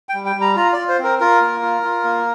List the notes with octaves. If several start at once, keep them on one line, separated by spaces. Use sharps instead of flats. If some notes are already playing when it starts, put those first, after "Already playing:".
G5
G3
G5
G3
A#5
F4 A#5
F4 D5
C5
C4 A#4
F4 A#4
A#3
F4
F4
A#3